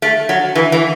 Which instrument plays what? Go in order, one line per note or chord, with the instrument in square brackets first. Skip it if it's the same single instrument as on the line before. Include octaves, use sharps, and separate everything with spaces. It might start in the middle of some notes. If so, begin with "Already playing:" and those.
[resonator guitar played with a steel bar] A3
F#3
E3
E3